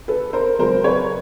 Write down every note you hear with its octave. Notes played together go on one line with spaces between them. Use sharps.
A4 B4
A#4 C5
C#2 C#3 F#3 A#4 C5
B4 C#5